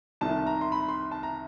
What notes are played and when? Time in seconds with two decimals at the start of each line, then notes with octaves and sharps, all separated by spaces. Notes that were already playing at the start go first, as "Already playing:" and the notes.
0.21 C2 C3 D#3 A5
0.46 A#5
0.61 C6
0.72 B5
0.89 C6
1.12 A5
1.23 A#5